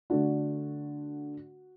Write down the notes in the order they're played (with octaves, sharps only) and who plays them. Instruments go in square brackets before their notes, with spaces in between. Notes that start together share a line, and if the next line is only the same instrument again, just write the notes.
[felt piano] D3 A3 D4 F#4